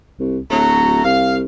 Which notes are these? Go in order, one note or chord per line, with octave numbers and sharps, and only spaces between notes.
C2
D1 F#3 A3 A#5
C2 F5